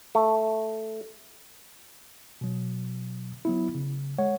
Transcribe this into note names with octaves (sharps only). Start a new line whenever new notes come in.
A3
B2 F#3
F#3 B3 E4
C#3
G#3 C#5 F#5